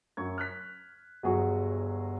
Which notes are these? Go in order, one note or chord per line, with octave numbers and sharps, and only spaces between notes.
F#2 C#6 G#6
F6 F#6 B6
G1 F#3 F#4 G#4 C#6